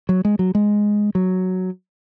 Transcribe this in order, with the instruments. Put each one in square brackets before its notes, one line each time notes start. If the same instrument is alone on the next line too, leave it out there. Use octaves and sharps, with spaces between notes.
[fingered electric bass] F#3
G#3
F#3
G#3
F#3